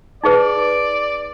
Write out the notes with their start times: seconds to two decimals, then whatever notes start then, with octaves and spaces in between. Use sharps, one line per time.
0.24 D#4 G#4 B4 D5